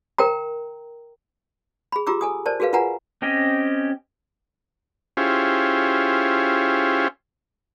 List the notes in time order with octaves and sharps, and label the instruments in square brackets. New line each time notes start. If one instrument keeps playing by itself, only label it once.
[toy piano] A#4 G5 A#5
G#4 B5
F4 G4 A#5 D6 E6
A4 G#5 D#6
A#4 C5 D5 A5
F#4 G#4 A#4 B4 F5
F4 A#4 B4 F#5 G#5 A#5
[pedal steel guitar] C4 C#4 G4 D#5
[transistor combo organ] C#4 E4 F4 G4 G#4 C5